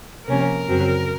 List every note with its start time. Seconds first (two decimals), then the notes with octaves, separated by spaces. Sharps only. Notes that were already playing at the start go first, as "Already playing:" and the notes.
0.28 C3 F3 A#3 C#4 A#4
0.68 F#2 C#3 F#3 C4